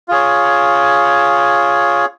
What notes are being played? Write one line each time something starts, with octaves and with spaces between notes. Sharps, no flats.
F4 G#4 C#5